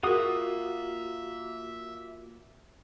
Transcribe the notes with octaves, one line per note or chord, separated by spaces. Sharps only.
A#3 F4 F#4 G#4 A#4 E5 D#6